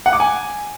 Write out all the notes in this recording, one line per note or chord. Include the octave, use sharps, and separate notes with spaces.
F#5
D6
G#5